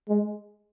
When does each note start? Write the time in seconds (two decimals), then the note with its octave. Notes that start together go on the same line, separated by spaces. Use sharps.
0.09 G#3